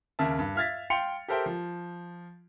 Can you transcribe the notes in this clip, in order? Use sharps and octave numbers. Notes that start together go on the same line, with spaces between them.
D#2 C#3 A#4 E5 A5
G2
E5 F5 F6 G#6 A6 B6
F5 G5 C6 C#7 F7
G4 A4 A#4 C5 E5 G5
F3